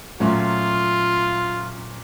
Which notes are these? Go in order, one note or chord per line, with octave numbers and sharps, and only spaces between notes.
A#2 F#3 A3 C#4 F4 F#4